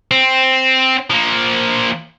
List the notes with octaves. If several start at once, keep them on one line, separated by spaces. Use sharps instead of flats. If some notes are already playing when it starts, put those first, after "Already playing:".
C4
F3 A#3